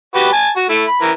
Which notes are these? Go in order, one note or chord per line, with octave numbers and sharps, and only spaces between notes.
F#4 G4 B4
G#5 A5
F#4
A3 E4
B5
E3 A#4